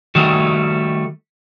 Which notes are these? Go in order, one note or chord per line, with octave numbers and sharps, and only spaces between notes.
D#3 G3 A3 F#4